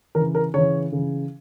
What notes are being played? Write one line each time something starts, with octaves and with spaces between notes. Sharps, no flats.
C#3 E3 A#4
A#4
C#3 E3 C#5
C#3 E3